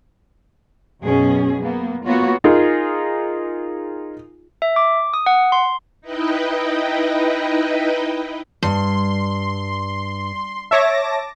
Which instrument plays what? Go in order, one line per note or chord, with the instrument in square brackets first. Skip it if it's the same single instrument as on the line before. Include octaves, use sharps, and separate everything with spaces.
[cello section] F#2 B2 C#4 G#4
A#3 B3
A#3 B3 F4 F#4 C#5
[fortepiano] D#4 F4 G#4 A#4
[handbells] E5
D6
D#6
F#5
C6
[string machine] D#4 E4 B4 D#5 G5
[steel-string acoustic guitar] G2 [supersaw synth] C6
[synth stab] C#5 E5 [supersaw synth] A5 D6 A#6